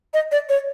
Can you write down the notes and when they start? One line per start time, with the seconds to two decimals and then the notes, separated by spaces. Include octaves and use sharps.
0.14 D#5
0.32 D5
0.49 C#5